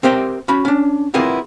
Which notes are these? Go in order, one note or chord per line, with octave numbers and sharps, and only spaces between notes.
C4 G4 A#4 C5 E5 G5
C#4 F#4 B5
C#4 D4
B3 C4 E4 F4 G#4 A#4